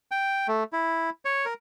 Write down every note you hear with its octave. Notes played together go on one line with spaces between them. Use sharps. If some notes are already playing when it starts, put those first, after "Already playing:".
G5
A3
E4
C#5
A#4